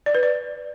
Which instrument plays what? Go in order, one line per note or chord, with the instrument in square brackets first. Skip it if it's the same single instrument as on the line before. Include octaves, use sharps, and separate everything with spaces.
[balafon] D5
B4
D5